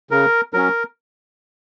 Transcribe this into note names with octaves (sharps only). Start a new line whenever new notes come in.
C#3 A#4
F#3 C#4 A#4